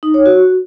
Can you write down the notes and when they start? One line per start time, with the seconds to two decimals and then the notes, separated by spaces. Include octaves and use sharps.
0.03 D#4
0.14 C#5
0.26 F#4